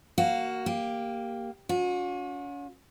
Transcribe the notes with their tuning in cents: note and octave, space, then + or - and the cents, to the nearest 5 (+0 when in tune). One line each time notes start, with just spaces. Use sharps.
A#3 +0 F#4 +15 F5 +0
A#3 +0 G4 +5
C#4 +35 F#4 -45